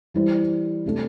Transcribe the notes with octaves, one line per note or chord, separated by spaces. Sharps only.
E3 G3 E4 C5
C3 A3 D4